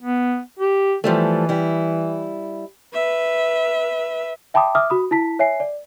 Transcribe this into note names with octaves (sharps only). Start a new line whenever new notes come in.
B3
G4
E3 F3 G3 A3
G3 E4
B4 E5
E5 G5 A5 B5 D6 D#6
E5 D6 D#6 F6
F#4 B5 D#6
E4 A5 B6
C#5 E5 G#5 C7
D5